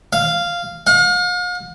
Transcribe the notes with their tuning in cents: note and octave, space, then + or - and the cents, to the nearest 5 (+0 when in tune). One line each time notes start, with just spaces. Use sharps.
F5 -5
F5 +45